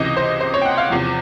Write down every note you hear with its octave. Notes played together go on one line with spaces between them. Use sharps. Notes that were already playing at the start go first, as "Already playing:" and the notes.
Already playing: C#2 C3 E3 D#5
C5
C5
C#5
G5
F#5
F5
E2 C3 F3